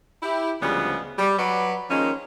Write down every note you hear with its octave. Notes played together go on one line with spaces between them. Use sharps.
E4 G4
D2 C#3 F3 G3 G#3 B3
G3
F#3 B4 D5
D#3 F3 G#3 A#3 C#4